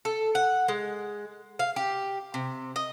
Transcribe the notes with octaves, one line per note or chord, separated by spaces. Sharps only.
A4
F#5
G#3
F5
G4
C3
D#5